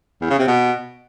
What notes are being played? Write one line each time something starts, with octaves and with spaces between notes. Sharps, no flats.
E2
C#3
C3
B2